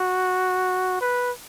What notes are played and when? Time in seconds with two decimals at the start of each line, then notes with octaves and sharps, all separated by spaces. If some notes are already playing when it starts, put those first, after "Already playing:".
Already playing: F#4
1.01 B4